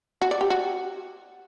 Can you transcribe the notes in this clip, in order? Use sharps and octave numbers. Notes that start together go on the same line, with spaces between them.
F#4
D5
G4
F#4